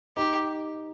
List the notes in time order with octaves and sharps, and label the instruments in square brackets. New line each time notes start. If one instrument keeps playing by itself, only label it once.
[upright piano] D#4 [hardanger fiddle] G4